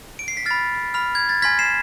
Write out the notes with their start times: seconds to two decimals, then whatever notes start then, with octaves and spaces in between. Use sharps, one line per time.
0.19 D7
0.28 C7
0.37 B6
0.46 B5 F6 A6
0.94 B5 F6
1.15 G#6
1.29 A6
1.42 G#5 C6 F6 G#6 B6
1.59 C7 E7